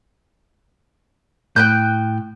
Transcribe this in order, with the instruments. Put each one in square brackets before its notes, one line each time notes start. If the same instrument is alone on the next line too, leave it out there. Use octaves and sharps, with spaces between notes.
[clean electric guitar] A2 [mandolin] G5 F#6 G6